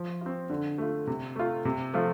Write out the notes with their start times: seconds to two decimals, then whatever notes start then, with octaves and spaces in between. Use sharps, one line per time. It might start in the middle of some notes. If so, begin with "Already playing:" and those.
Already playing: F3
0.21 C4 F4
0.50 D3
0.78 A3 F4
1.07 C3
1.36 A3 F4
1.65 C3
1.94 F3 A3 F4